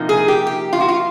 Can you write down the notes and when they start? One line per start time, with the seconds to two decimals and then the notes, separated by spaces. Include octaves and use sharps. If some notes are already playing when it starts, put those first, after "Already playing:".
Already playing: C3 F3 A#3 D#4
0.09 G#4
0.28 G4
0.47 G4
0.73 F4
0.80 F#4
0.89 F4